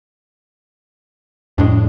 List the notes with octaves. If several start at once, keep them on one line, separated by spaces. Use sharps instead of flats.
F2 A2 G#3 D4